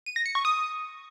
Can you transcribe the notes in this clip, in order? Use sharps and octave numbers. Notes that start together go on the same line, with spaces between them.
D#7
A#6
C#7
C#6
D#6